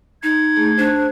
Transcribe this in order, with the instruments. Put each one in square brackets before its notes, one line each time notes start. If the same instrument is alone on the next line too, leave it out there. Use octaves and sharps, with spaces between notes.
[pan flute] D#4 [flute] G#6
[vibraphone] A3 G#4
[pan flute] D4 [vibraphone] C5